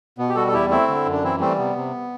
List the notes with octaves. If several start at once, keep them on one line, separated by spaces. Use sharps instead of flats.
B2 B3
G4
G3 F#4 A4
A4
E2 E4 G4
A3 C4 E4
D3
F#2
D4
E3 C4 E4
G3 A3 C4
C3 B3
C3